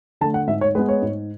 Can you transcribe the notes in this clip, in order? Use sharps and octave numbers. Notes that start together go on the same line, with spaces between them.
D3 A3 A5
F#5
G#2 E5
C#5
G#3 B3 B4
C#5
G#2